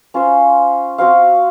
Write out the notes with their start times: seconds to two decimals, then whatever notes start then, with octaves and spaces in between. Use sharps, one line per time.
0.14 C#4 F4 C5
0.98 C4 F#4 C5 F5